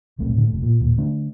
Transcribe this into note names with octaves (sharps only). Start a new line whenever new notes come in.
D1 B1 A3 C4
A2 D3
F1 A3
A#2
D#2 A#2
D3 A3 D4